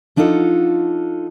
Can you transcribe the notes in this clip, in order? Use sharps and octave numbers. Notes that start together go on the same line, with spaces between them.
F3 D4 D#4 F4 A4 F#5